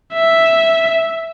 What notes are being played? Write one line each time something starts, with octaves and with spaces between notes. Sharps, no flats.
E5